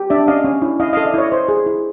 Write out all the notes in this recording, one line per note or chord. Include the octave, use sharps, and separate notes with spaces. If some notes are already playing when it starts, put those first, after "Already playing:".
Already playing: G4
D4 D5 E5
C#4 D#5 F5
C#4
E4
E4 D#5 F5
A4 D#5 F5
D5 E5
E4 C#5 D#5
C5
G#4
E4